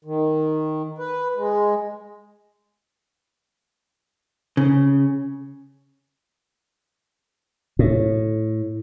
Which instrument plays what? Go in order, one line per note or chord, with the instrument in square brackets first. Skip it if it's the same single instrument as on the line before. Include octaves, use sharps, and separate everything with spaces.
[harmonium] D#3
B4
G#3
[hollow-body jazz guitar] C#3
[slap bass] A2